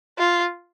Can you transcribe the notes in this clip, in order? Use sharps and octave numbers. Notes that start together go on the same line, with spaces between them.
F4